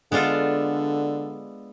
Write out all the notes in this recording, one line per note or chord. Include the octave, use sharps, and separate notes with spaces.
D3 G#3 B3 D4 F4 A4